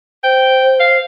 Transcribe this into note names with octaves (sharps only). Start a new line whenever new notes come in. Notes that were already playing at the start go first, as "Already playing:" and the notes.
C5 G5
F5